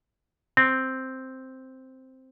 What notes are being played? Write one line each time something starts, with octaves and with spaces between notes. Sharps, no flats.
C4